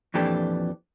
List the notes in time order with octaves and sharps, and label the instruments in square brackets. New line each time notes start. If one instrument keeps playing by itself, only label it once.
[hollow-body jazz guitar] F2 A#2 E3 D4 G4 A4